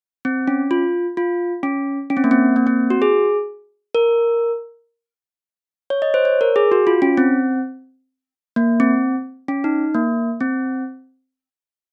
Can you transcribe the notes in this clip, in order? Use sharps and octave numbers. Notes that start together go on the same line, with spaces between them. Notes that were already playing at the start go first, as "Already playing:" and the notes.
C4
C#4
F4
F4
C#4
C#4
C4
A#3
C4
A#3
C4
F#4
G#4
A#4
C#5
D#5
C5
C#5
A#4
G#4
F#4
F4
C#4
C4
A#3
C4
C#4
D#4
A#3
C4